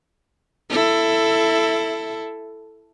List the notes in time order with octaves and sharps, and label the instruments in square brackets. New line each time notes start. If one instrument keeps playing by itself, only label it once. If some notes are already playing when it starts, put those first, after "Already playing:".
[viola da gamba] E4 A4